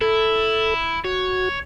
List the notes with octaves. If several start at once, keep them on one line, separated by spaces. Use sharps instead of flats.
E4 A4
F#4 C#5